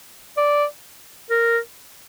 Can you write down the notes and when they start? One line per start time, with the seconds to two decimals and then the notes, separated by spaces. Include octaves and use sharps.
0.37 D5
1.30 A#4